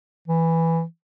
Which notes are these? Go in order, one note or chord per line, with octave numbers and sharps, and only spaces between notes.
E3